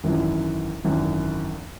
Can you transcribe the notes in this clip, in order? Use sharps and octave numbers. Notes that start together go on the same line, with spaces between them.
G#1 F#2 E3
G#1 F#2 E3